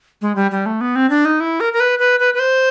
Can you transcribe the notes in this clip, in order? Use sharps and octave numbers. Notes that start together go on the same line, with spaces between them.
G#3
G3
G3
A3
B3
C4
D4
D#4
E4
A#4
A#4
B4
B4
B4
B4
C5